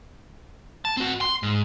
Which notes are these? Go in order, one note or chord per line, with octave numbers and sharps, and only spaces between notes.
A5
C4 F#4
C6
G#2